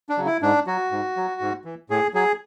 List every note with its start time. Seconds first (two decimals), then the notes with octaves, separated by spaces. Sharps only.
0.09 D4
0.17 C#3 F#3
0.26 E4
0.42 G#2 D4
0.67 F#3 F#4
0.91 G#2
1.16 F#3
1.41 G#2
1.65 E3
1.90 A2 G#4
2.14 F#3 G#4